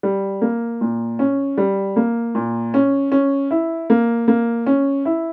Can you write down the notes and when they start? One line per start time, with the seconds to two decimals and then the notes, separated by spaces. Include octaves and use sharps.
0.03 G3
0.42 A#3
0.81 A#2
1.19 C#4
1.58 G3
1.96 A#3
2.35 A#2
2.74 C#4
3.12 C#4
3.51 E4
3.90 A#3
4.28 A#3
4.66 C#4
5.05 E4